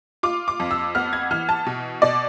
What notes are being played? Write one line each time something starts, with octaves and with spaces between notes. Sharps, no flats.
F4 D6
D6
F2
E6
B3 F6
G#6
E3 F6
A5
B2
B2 D5